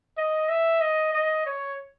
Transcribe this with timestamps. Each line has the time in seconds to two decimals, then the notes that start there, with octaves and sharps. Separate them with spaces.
0.17 D#5
0.49 E5
0.81 D#5
1.13 D#5
1.46 C#5